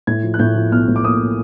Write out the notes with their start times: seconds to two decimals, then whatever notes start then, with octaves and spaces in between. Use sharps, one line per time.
0.07 A2 G#6
0.23 F3
0.34 F#6
0.39 A2 G6
0.55 F3
0.71 B1 F6
0.88 A2
0.96 D6
1.04 A#3 D#6